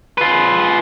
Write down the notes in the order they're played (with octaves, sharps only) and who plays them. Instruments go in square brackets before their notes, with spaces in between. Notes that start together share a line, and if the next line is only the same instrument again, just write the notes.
[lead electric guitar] F4 B4